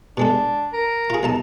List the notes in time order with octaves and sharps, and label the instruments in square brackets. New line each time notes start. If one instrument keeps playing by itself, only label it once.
[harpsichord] B2 G#3 A4 [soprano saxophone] D4
[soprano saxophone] A#4
[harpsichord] F4 G#4
B1 D#4 A5